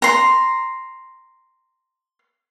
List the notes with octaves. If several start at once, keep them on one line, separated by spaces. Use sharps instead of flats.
A#5 C6